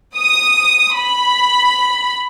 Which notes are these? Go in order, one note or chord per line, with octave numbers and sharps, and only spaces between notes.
D#6
B5